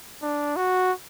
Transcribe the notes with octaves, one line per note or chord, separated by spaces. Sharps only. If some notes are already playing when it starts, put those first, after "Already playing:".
D4
F#4